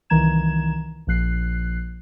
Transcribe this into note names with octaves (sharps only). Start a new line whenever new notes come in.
C2 D#3 E3 A#5 G#6 E7
A#1 F3 F#6 C7